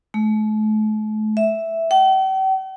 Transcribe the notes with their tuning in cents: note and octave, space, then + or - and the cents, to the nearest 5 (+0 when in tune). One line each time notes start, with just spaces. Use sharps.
A3 -40
E5 +0
G5 -45